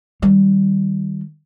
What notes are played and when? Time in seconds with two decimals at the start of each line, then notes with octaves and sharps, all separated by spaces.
0.22 D#3 G3